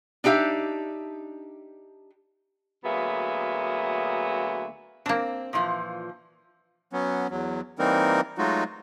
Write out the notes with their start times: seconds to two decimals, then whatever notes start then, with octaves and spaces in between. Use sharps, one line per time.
0.24 D4 D#4 G4 E5 F5
2.85 D2 F#3 A#3 B3 G#4 E5
5.06 A#3 C4 D4
5.53 A#2 E3 F3
6.93 F#3 B3 C#4
7.31 E2 F#3
7.79 E3 G3 A#3 C4 D#4 A#4
8.38 F#3 G#3 A3 D#4 F4 F#4